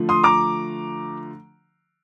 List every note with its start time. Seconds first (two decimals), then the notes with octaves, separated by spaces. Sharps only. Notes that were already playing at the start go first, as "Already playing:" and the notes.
Already playing: D3 F3 A3
0.09 C6 D#6
0.23 A#5 D6